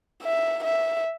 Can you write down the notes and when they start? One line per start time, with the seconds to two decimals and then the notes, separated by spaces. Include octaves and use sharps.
0.23 E5
0.64 E5